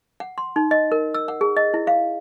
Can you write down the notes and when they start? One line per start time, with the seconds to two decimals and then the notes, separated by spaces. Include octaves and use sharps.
0.20 F#5
0.38 C6
0.56 D#4
0.71 D#5
0.92 A#4
1.14 E6
1.28 F#5
1.41 G#4
1.57 D#5
1.74 E4
1.87 F5